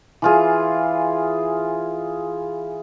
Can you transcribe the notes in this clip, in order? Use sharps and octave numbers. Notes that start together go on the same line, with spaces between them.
E3 F4 G#4